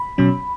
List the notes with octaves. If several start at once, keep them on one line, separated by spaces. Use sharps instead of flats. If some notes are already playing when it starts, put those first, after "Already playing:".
Already playing: B5
B2 F#3 C#4